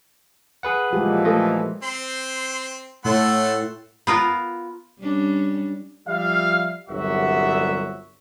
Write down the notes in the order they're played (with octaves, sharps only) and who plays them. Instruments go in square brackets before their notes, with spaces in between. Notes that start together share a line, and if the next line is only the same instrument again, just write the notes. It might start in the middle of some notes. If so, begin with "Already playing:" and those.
[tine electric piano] G#4 B4 F#5
[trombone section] A#2 E3 F3 [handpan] G#3 G4
[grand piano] A3 [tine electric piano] D#5
[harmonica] C4 [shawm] C6
[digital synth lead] A2 [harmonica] A3 F#5 C6 [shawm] A4
[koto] B3 F4 A#4
[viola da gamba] G3 C#4 D4
[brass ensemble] F3 G3 E5 F5
G1 C2 F#3 F#4 E5